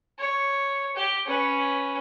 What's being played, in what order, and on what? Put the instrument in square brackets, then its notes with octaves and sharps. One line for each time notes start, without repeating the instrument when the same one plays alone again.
[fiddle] C#5
G4
C#4 B4